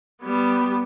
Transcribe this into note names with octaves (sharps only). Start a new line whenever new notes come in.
G3 B3